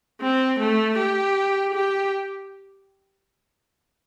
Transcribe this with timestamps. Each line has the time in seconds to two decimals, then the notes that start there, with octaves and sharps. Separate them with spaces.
0.21 C4
0.59 A3
0.98 G4
1.74 G4